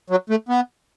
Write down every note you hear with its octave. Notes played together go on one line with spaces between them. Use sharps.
F#3
A3
B3